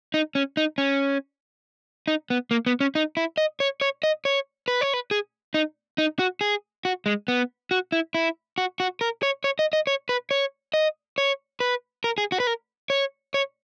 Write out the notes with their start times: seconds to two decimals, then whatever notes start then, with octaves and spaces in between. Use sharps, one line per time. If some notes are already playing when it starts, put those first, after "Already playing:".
0.14 D#4
0.35 C#4
0.57 D#4
0.78 C#4
2.08 D#4
2.30 B3
2.51 A#3
2.66 B3
2.80 C#4
2.95 D#4
3.17 E4
3.38 D#5
3.60 C#5
3.81 C#5
4.03 D#5
4.25 C#5
4.68 B4
4.81 C#5
4.94 B4
5.11 G#4
5.54 D#4
5.98 D#4
6.19 F#4
6.41 G#4
6.85 F#4
7.06 G#3
7.28 B3
7.71 F#4
7.92 E4
8.14 E4
8.58 F#4
8.80 F#4
9.01 A#4
9.23 C#5
9.44 C#5
9.59 D#5
9.73 D#5
9.87 C#5
10.09 B4
10.31 C#5
10.74 D#5
11.18 C#5
11.60 B4
12.04 A#4
12.18 G#4
12.32 F#4
12.40 B4
12.47 A#4
12.90 C#5
13.34 C#5